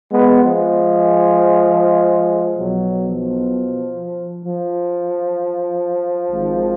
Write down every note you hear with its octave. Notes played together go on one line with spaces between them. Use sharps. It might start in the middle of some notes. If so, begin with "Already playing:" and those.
G#3 B3
F3 G#3
B1 B2 F#3
F3
F3
G#1 G#2 D#3